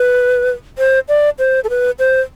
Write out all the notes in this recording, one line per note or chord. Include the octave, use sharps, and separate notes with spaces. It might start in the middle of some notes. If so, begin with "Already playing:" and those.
Already playing: B4
C5
D5
C5
A4
B4
C5